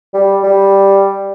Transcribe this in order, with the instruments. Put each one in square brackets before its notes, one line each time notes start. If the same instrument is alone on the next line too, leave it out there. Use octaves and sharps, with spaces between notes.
[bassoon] G3
G3